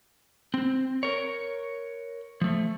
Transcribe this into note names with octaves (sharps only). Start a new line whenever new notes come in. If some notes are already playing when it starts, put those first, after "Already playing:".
C4
A#4 C#5
F3 A3